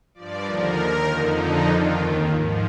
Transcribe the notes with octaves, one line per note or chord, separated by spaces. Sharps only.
G2 F3 D5
D#2 D3 F3 A#4
D#2 D#3
F2 D3 F3 D#4
F2 D3 F3
F2 D#3 F4
D#2 D#3
G#2 F3